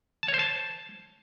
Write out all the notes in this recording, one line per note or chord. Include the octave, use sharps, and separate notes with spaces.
A5
C#5
C5
A5